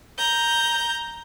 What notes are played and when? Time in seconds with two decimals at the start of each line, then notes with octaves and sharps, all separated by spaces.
0.18 A#5 G6